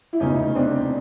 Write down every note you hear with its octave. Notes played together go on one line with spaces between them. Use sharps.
E4
F1 E2 C#3 E3 C#4 D#4
C4 D4